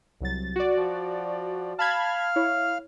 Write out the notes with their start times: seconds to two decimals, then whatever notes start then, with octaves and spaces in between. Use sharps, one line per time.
0.21 C2 F#3 A6
0.56 F#4 D5
0.77 F3
1.79 F5 A5 B5 F6 G#6
2.36 E4 C#5